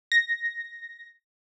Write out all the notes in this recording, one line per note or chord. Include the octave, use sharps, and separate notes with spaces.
A#6